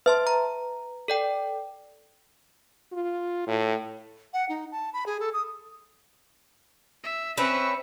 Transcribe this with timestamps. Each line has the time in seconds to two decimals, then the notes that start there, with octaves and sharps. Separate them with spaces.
0.06 B4 E5 A5 C6
0.27 A#5
1.08 A4 D5 G5
2.93 F4
3.47 A2
4.33 F#5
4.49 D#4
4.72 A5
4.93 B5
5.06 G#4
5.20 A4
5.33 D#6
7.04 E5
7.38 C4 C#4 B4 E5 C#6